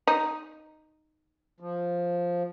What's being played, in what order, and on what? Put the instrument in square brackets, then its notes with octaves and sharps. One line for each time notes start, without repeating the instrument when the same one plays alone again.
[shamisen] D#4
[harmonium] F3